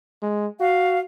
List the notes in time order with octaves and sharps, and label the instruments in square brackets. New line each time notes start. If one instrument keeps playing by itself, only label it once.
[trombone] G#3
[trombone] F#4 [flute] F5